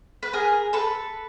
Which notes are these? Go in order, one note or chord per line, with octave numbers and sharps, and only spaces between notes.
B4
G#4 A#4
A4 B4